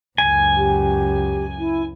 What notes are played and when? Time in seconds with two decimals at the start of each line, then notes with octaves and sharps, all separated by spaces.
0.18 C#2 F#2 G#5
0.57 G4
1.59 E4